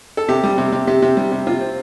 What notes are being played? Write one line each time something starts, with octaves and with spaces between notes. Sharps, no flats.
A4
C3 G4
G3
C3
C3
C3 G4
C3
G3
C3
C3 F4
C4